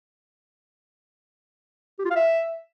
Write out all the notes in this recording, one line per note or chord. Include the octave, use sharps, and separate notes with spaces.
G4
F4
F5
E5